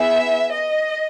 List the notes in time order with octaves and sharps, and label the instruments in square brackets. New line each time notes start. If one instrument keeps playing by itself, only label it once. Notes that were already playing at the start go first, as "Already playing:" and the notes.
Already playing: [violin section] B3 E4 G#4 E5
D#5